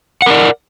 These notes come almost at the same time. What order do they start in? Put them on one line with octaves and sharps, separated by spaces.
F#5 A#4 D5